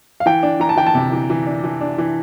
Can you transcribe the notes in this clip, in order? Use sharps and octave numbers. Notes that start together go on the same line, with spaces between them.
F5
E3 G5
D4
E3 A#5
A5
E3 G5
A5
C3
E3
E3
D4
E3
D4
E3